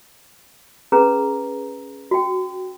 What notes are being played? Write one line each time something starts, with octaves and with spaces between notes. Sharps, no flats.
C#4 G#4 B4 A#5
F#4 G5